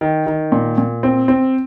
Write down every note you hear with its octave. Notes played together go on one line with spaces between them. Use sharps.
D#3
D#3
A#2
A#2
C4
C4